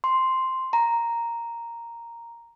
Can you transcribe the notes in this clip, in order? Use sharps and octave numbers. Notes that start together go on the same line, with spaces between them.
C6
A#5